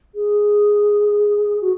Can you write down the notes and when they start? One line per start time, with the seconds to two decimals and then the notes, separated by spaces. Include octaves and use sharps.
0.15 G#4
1.61 F#4